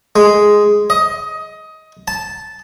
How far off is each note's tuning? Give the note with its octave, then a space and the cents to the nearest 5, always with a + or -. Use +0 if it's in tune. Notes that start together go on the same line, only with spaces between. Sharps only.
G#3 +0
D#5 +20
A5 -10